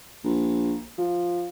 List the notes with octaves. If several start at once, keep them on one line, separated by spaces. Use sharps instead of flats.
A#1
F3